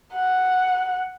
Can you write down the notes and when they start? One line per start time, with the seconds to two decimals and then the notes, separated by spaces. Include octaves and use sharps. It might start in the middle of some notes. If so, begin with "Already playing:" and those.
0.15 F#5